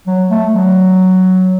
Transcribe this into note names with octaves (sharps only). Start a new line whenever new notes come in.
F#3
A3
F#3